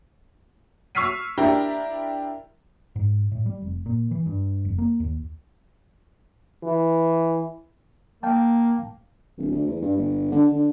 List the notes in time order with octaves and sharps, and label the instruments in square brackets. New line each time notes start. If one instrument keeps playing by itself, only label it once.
[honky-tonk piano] C#6 E6 F6 B6 C7 D#7
D4 E4 G4 A#4
[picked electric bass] G#2
A2
G3
F1
A#2
E3
G2
F1
A#3
D#2
[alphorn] E3
[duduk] A#3 [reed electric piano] F5 G5 A5
[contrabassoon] D1
D2
E2
G2
G1
D3
D3